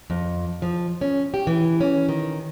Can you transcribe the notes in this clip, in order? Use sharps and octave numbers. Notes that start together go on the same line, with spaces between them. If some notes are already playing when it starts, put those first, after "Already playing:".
F2
F3
C#4
G4
E3
C#4
D#3